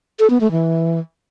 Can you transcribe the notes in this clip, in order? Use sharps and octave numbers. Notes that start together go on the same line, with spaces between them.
A4
B3
A3
E3